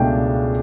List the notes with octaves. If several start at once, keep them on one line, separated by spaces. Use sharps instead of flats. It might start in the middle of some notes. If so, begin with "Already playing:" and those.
Already playing: C#2 B2 A3 D4 G5